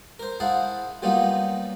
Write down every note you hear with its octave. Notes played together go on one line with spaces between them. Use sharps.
A#4 C5
E4 G#4 C5 F5 F#5 A5
F#3 G3 A#3 B3 D#4 F4